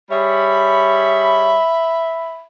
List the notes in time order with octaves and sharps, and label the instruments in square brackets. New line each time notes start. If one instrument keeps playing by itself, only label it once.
[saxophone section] G3 G#4 C#5 [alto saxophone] E5 [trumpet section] B5